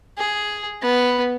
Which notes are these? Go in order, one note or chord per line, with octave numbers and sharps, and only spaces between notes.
G#4
B3